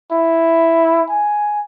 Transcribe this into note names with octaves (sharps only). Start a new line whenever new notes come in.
E4
G#5